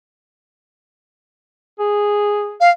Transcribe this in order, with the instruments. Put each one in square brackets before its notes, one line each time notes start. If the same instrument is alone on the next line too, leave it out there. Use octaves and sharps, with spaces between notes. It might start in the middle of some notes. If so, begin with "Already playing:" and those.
[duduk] G#4
[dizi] F5